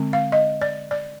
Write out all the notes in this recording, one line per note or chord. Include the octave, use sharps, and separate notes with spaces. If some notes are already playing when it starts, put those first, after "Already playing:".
Already playing: D3 G#3 C4
F5
D#5
D5
D5